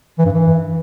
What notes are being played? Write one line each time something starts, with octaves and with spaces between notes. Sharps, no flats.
E3
G2
E3